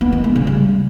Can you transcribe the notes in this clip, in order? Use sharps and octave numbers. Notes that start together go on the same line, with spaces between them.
B3
D#3
G#3
C#3
G3